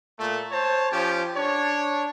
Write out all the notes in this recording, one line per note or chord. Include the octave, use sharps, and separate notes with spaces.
A#2 A3
C5 C#5 A5
F3 C#4 G4
D4 C#5